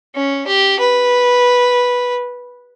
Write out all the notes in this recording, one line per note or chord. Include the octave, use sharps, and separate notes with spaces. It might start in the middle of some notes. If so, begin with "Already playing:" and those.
C#4
G4
B4